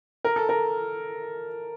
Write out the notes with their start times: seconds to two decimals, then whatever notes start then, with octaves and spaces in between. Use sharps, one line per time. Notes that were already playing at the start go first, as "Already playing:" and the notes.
0.25 A#4
0.36 A4
0.49 A#4